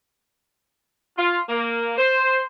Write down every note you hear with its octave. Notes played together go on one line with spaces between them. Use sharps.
F4
A#3
C5